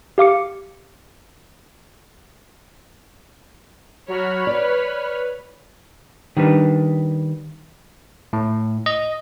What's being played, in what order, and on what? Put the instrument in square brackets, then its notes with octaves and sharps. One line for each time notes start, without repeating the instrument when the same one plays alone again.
[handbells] G4 F5 D6 C#7
[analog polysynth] F#3 F#4 [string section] C#5 B5 F6
[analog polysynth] B4 [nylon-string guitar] D5
[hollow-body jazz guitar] D#3 G3 D4 B4
[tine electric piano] A2
D#5